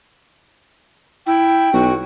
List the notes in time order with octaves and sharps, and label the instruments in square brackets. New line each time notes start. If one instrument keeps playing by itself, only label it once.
[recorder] E4 [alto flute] G5
[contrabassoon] B1 [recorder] F#4